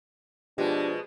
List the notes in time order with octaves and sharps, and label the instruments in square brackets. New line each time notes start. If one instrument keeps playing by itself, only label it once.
[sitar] B2 G#3 [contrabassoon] F3 [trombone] D4 [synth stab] G4 B4